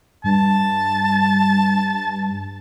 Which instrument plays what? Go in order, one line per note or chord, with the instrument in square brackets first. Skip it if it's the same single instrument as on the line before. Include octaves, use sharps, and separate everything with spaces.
[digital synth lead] G2 [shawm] A5